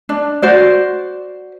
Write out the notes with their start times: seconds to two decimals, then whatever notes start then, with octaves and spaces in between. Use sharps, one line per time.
0.09 D4
0.42 F#4 C5 D5